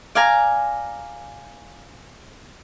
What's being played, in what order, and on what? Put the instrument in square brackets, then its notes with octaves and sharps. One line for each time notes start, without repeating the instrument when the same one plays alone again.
[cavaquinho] D5 F5 G#5 A#5